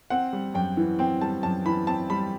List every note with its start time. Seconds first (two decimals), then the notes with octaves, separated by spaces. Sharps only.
0.10 C4 F#5
0.33 G3
0.54 F#2 G5
0.77 E3
0.99 C4 G5
1.21 G3 A5
1.43 F#2 A5
1.66 E3 B5
1.87 C4 A5
2.10 G3 B5